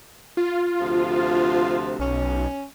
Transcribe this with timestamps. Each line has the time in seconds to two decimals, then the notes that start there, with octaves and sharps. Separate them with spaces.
0.37 F4
0.79 D2 C3 F3
1.99 B1 C#4